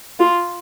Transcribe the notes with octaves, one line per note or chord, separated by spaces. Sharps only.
F4